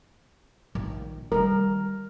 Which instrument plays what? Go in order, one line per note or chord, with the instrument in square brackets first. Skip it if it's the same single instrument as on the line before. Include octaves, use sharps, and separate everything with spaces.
[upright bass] A#1 D#3
[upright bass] D#3 G3 [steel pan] A#4